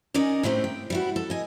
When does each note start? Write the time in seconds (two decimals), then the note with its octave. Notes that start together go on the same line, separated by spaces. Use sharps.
0.14 C#4 D#4 A#4 D5 D#5 G#5
0.43 A2 D#3 A3 C4 G4
0.64 G5
0.90 G3 E4 F#4
1.16 A4
1.30 D#5 G#5